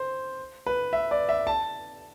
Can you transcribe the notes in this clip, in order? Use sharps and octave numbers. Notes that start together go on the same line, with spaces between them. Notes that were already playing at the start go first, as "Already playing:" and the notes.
Already playing: C5
B4
E5
D5
E5
A5